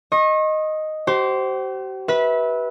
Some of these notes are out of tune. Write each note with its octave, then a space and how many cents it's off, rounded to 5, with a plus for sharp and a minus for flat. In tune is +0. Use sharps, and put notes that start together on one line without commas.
D#5 +0 C#6 -40
G4 -45 C5 +0
B4 -15 E5 -25